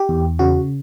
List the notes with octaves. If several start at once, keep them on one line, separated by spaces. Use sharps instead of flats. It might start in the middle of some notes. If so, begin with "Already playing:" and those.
Already playing: G4
E2
C#3 F#4